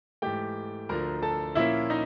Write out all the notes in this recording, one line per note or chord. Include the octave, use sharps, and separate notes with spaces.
G#2 E3 A3 G4 G5
D2 D3 F3 A3 A#4 A#5
A4 A5
A#2 F3 A#3 C#4 E4 E5
D#4 D#5